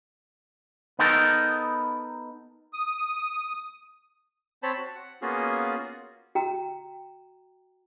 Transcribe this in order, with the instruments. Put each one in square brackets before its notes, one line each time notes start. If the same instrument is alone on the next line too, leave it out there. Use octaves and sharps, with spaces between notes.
[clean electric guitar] B3 D#4 A4 A#4
[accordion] D#6
[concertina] C4 C5 C#5 A5 B5
F#4
F#5
A#3 B3 C#4 F4 F#4 G#4
[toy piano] F#4 G5 A#5